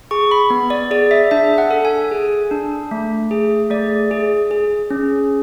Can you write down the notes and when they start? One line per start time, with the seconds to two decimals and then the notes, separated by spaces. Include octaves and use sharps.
0.11 G#4 C#6
0.31 B5
0.50 B3
0.70 D5
0.91 G#4 D5
1.11 E5
1.31 D4 E5
1.58 F#5
1.71 A4
1.85 G#5
2.11 G#4
2.51 D4
2.91 A3
3.31 G#4
3.70 A3 D5
4.11 G#4
4.51 G#4
4.90 C#4